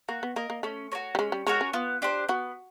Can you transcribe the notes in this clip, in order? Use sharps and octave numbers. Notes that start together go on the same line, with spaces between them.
A#3 F#4
B3
A#3 A#4 D#5
A#3
A3 C#4
F#4 A#4 C#5
G3
G#3 C#4
G3
G#3 F#4 A#4 C#5
C#4
B3 F4
D4 G4 C5
B3 F#4